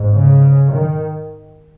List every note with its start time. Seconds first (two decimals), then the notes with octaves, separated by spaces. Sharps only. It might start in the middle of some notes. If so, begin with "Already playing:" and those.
Already playing: G#2
0.14 C#3
0.72 D#3